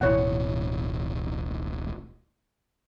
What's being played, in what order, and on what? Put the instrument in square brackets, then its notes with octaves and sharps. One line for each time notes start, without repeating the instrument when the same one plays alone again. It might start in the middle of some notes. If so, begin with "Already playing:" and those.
[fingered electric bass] D1 A1 B2 [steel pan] E4 C#5 F#5